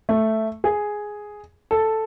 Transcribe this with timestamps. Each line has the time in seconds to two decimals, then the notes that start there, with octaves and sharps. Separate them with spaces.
0.09 A3
0.64 G#4
1.71 A4